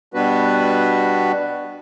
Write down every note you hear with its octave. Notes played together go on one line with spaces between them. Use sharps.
B2 G3 B3 D4 F#4 B4